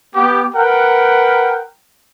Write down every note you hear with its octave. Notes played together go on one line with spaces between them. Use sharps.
B3 G4
A#4 B4 F#5 G5